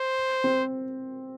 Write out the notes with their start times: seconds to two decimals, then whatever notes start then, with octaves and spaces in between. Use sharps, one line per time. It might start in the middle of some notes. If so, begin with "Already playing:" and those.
Already playing: C5
0.44 C4